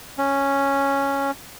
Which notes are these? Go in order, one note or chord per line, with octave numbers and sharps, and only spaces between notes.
C#4